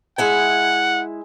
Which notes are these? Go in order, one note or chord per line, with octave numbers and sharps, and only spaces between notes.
G#3 E4 F#5 G#5